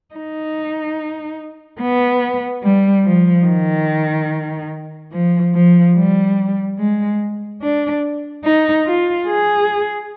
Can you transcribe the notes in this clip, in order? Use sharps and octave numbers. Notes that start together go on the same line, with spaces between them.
D#4
B3
G3
F3
D#3
F3
F3
G3
G#3
D4
D#4
F4
G#4